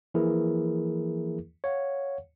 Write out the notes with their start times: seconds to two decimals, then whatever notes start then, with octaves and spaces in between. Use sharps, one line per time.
0.14 E3 F3 A#3 E4 G#4 A#4
1.64 C#5 F5 F#5